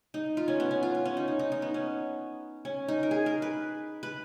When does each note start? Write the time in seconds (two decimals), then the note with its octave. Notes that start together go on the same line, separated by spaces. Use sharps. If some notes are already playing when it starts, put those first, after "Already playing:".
0.14 D#4
0.37 F4
0.48 C#4
0.60 B3
0.71 C#4
0.83 F4
0.95 F4
1.05 C#4
1.17 D#4
1.28 D#4
1.39 D#4
1.52 D#4
1.62 B3
1.74 C#4
2.65 C#4
2.88 D#4
3.03 A#4
3.11 G#4
3.26 A#4
3.42 B4
4.03 B4